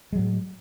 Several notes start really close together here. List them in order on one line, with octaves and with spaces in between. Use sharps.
G#3 F#3 A2